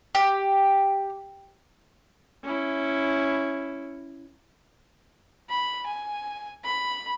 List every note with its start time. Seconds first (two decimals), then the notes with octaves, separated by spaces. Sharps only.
0.15 G4
2.44 C#4 E4
5.50 B5
5.87 G#5
6.65 B5